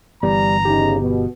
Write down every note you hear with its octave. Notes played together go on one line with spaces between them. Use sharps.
G1 E3 G3 B3 A#5
E2 C#3 D#4 G4
B2